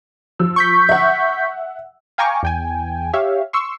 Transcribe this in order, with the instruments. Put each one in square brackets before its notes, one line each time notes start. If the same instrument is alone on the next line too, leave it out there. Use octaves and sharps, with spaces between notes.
[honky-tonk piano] F3 E6
[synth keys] C#6 G6 B6
[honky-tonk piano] E5 F#5
[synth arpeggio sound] F5 G5 G#5 A#5 C#6 D6
E2 G5 G#5
G4 C#5 E5 F5
C6 C#6 E6